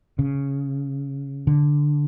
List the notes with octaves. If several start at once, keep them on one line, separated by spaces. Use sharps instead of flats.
C#3
D3